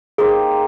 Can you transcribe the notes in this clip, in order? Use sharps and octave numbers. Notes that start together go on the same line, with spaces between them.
A#3 D#4 G4 G#4 C5